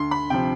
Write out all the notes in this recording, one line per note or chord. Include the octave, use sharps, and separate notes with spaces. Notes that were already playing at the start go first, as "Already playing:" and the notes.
Already playing: D2 C6
B5
C3 F3 G5